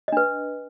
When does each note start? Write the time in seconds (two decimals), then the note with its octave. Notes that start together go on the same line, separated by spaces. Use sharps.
0.08 D#5
0.12 D4
0.17 B4